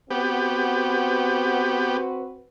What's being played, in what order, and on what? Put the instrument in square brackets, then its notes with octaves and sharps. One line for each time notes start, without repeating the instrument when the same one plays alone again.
[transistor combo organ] B3 G4 [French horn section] C4 F#4 B4